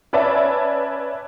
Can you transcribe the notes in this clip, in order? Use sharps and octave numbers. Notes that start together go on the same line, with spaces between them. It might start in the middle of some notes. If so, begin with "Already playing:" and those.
C#4 B4 D5 E5 G#5 A5